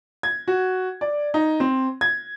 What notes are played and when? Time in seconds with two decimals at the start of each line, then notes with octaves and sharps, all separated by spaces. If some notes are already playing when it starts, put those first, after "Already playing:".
0.23 G#6
0.48 F#4
1.01 D5
1.34 D#4
1.60 C4
2.01 G#6